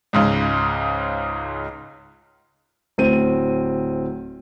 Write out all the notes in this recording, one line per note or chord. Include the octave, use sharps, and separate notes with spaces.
C#2 G#2 C#3
D1 C4 D#7